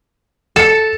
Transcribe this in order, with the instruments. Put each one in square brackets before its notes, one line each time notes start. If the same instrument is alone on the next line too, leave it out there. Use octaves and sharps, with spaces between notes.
[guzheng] A4 [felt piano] C#7 E7